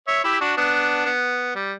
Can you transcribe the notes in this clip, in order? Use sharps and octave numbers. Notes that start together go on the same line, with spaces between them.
C#5 E5
E4 G4
D4 F#4
B3 D4
B3
G3